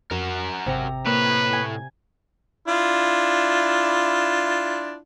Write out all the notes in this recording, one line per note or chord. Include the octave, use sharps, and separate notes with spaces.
F2 F#4 A#4
G#1 C3 A#5
A2 A#3 B4 C#5
G#5
D4 E4 F4